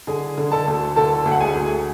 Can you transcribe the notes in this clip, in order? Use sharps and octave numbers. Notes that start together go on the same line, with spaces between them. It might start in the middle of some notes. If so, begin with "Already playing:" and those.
D3 G#4 G#5
D3
A4 A5
D2
D3 A4 A5
D2
F#5
G#4 G#5
D2